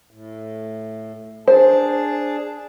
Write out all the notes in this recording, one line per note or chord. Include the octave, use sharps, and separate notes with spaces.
A2
D4 G#4 C5 A5